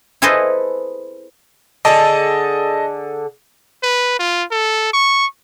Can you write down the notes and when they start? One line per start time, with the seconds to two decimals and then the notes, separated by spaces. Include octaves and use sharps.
0.22 E4 G#4 A4 B4 C5 D#5
1.85 D3 G#4 A4 D#5 A5
3.83 B4
4.19 F4
4.51 A4
4.93 C#6